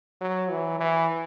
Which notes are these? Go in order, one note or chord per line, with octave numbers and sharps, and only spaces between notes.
F#3
E3
E3